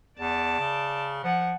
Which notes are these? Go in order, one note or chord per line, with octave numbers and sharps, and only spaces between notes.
E2 D5 A5
C#3
F3 F#5